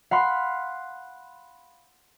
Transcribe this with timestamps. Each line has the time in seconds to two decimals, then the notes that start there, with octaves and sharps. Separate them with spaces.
0.11 F5 F#5 B5 C6 B6